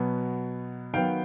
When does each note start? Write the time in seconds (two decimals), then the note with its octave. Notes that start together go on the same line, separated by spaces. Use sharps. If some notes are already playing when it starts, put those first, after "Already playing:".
Already playing: B2 F#3 B3
0.93 D#3 F#3 B3 F5 G5